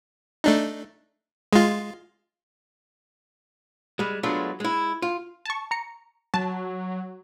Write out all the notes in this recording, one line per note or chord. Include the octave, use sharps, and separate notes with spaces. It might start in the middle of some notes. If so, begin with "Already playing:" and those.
A3 D4 D#4
G#3 F4
G3 G#3
F#3 G#3 A3 B3 D4 F4
G#3 E4
F4
A5 C#6
A#5 C#7
F#3 A5